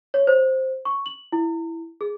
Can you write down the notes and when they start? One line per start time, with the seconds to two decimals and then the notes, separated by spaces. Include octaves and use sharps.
0.14 C#5
0.27 C5
0.85 C#6
1.06 F#7
1.32 E4
2.01 G#4